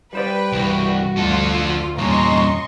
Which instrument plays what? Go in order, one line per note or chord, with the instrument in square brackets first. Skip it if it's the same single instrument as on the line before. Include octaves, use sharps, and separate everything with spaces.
[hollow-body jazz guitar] G3 C5 D5 [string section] B4 G5
[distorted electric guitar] C2 [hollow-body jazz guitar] G2 E3 [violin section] F#4
[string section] D2 F4 [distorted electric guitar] F3 A4
[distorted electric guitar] E2 A#2 [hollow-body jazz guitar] G2 [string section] C#4 A#5 [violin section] D#5 C6 C#6